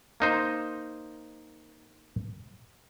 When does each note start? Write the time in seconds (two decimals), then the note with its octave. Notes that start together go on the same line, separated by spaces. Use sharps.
0.20 A#3 D#4 C5